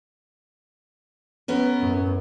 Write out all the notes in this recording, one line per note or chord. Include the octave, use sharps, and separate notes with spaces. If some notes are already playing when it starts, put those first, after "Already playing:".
B3 C#4 A#4
F#2 A2